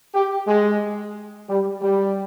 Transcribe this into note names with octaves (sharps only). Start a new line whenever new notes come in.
G4
G#3
G3
G3